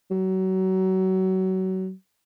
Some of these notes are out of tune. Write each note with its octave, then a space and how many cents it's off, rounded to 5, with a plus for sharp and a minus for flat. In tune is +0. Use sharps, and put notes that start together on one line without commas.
F#3 +25